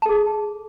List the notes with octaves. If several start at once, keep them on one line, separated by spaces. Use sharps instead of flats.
G#4 A4 A5